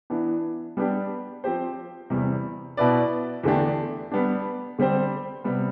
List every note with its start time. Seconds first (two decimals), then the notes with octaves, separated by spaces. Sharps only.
0.10 E3 B3 D4
0.77 G3 B3 D4 G4
1.44 F3 C4 G4 C5
2.10 E2 C3 G3
2.77 B2 B3 E4 B4 D5
3.43 E2 D3 A3 D4 G4
4.12 G3 B3 D4
4.79 D3 G3 C4 G4 C5
5.44 C3 G3 B3